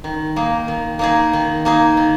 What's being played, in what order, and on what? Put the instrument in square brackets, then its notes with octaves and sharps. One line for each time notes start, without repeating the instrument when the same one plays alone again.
[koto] D#3
A#3 D#4 G#4
D#3
A#3 D#4 G#4
D#3
A#3 D#4 G#4
D#3